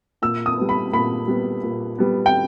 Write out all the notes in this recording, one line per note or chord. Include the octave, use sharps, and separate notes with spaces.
A#2 E6
D#6
G3 B3
B5
A#2 B5
G3 B3
A#2
G3 B3
G5